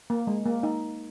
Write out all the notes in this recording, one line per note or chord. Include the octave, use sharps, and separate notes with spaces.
A#3
G#3
A#3
D#4